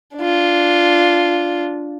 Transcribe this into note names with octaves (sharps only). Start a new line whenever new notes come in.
D4 F4